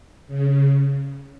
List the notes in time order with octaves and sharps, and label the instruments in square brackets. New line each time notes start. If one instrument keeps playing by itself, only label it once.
[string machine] C#3